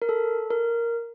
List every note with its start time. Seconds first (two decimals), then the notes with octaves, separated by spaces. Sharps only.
0.02 A#4
0.09 A4
0.51 A#4